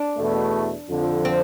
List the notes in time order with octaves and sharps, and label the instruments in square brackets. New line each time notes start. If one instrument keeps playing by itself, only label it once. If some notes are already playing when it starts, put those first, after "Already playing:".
Already playing: [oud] D4
[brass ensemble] E2 B2 A3
F2 D3 F3
[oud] C4